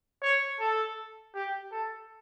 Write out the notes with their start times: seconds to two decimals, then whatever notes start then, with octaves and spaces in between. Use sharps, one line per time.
0.22 C#5
0.60 A4
1.35 G4
1.72 A4